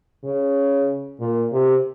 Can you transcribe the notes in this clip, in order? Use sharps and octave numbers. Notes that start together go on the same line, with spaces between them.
C#3
A#2
C3